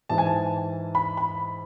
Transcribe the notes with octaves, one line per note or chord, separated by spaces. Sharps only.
G#2 E3 A5
G#5
A5
B5
B5